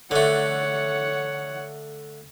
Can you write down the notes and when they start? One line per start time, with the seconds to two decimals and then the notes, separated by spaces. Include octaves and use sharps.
0.11 D3 A3 C#5 F#5